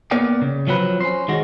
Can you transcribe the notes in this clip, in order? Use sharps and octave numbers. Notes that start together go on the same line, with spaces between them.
A#3 B3 A#4 D5 G5
C#3
F3 F#3 C4 B4
C#4 C5
D#3 G#3 F#4